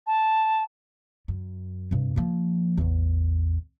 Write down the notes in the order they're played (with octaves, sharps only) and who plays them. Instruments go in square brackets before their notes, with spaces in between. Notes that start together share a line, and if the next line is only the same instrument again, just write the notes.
[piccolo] A5
[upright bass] F#2
G2 C3
F3 A#3
A1 E2